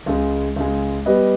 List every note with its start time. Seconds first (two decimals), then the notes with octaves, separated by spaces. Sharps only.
0.06 C#2 C#3 G#3
0.56 C#2 C#3 G#3
1.06 G3 B3 G4 B4 D#5